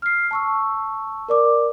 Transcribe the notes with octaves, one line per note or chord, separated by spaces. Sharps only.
F6 C7
A5 C#6 E6
A#4 D5 D6